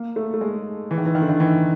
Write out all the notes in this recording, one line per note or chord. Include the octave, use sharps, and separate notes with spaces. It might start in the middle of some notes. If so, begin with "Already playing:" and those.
Already playing: A#3
A3
A3
G#3
E3
D#3
E3
D#3
D3
D#3
E3